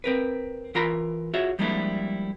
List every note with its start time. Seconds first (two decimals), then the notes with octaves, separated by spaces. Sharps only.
0.04 C4 A#4 B4
0.75 E3 F4 A#4 A#5 B5
1.34 F4 F#4 G#4 C#5 E5
1.59 F3 G3 G#3 A#3 D4 E4